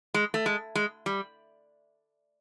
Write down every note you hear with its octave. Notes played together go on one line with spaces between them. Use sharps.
G#3
A3
G#3
G#3
G3